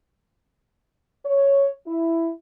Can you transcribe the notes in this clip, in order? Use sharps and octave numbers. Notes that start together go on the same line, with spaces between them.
C#5
E4